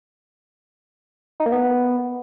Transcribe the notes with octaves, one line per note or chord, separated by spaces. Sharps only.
D#4
A#3
B3